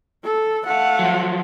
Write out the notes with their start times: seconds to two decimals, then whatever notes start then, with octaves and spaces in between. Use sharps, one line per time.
0.24 A4
0.66 A3 F5 F#5
0.99 F3 F#3